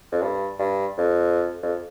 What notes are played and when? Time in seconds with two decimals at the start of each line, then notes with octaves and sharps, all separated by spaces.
0.12 F2
0.22 G2
0.59 G2
0.97 F2
1.63 F2